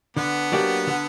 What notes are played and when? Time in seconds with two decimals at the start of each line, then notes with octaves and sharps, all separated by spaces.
0.17 D3 B3
0.52 F#3 A#3 D4 G4
0.87 D3